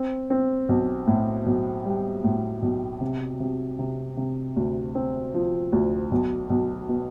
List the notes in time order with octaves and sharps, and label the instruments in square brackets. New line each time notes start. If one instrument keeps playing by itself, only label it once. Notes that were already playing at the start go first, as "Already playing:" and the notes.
Already playing: [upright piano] C4
C4
B1
A2
B1
G3
A2
B1
C3
C3
C3
C3
D2
C4
F3
D2
B1
B1
B2